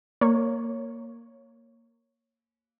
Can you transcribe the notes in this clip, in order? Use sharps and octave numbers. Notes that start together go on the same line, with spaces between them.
A#3 C#5